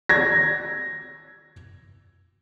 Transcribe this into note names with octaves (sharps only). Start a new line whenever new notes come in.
G#6 A#6